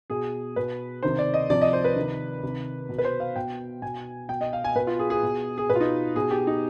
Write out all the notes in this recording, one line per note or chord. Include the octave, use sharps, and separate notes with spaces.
B2 G#4
B2 B4
C3 D#3 C5
D5
D#5
C3 F3 D5
D#5
C5
B4
C3 D#3
C3 D#3
B2
B4
C5
F5
B2 G5
B2 G#5
B2 G5
D#5
F5
G#5
B2 B4
F4
G#4
G#4
B2
G#4
B2 B4
F4
D#4
B2 G#4
G4
D#4